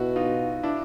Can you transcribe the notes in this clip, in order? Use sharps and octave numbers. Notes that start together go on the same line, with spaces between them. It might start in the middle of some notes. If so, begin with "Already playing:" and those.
Already playing: B2 E4 F#4
D#4 F4
D4 E4